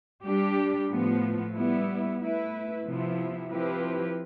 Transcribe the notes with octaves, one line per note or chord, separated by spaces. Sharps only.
G3 D4 G4
A2 F3 B3
G3 B3 E4
A3 E4 B4
C3 F3 B3 E4
F3 C4 E4 G4 B4